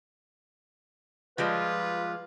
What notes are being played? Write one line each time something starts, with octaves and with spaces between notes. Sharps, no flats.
F3 G3 G#3 F4 B4